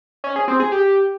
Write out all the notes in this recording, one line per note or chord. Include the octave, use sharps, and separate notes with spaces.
C#4
G#4
C4
G#4
G4